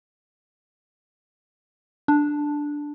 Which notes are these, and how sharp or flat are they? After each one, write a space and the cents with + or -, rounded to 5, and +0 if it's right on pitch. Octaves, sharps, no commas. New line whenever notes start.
D4 +0